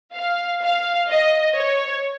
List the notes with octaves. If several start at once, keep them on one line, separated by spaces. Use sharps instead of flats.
F5
F5
D#5
C#5